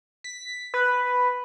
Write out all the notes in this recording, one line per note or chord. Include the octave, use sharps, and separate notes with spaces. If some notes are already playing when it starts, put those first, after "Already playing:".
B6
B4